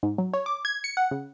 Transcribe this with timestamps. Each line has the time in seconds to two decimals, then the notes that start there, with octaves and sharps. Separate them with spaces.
0.03 G#2
0.18 F#3
0.33 C#5
0.46 D6
0.65 G#6
0.84 C#7
0.97 F#5
1.11 C#3